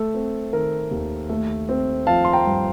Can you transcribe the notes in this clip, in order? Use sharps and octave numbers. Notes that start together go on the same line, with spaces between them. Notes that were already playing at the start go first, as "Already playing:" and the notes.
Already playing: A3 A4
C4
D#3 A#4
D#2
A3
C4
F3 F5 A5
C6
G5 A#5
G2